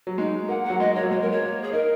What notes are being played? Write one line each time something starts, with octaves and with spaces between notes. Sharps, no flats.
F#3
G#3 D#4
A#3 F#5
F#5
F#3
G#3 D#5
A#3 C#5
F#3
G#3 C#5
A#4
G#3 C#5
A#3
G#4
D#4 A#4